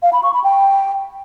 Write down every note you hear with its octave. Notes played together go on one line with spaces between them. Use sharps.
F5
B5
C#6
B5
G5